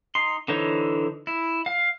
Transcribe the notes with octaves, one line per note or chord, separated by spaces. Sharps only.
D#4 C6
D3 E3 D#4 C5 C#5
E4
F5